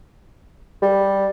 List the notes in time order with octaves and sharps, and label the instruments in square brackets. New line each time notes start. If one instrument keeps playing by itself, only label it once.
[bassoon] G3